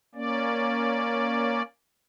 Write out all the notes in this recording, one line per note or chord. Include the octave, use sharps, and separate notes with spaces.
A#3 C#4 D5